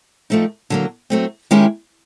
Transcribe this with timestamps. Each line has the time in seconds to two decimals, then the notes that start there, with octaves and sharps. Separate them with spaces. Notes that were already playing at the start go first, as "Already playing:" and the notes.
0.30 F3 A3 C4 D#4
0.70 D3 F#3 A#3
1.10 F#3 A3 C4
1.51 D#3 G#3 C#4 E4 G4